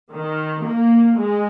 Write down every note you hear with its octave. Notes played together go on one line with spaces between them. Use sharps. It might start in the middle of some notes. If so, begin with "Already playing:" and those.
D#3
A#3
G#3